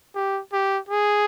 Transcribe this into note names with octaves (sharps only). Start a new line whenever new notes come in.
G4
G4
G#4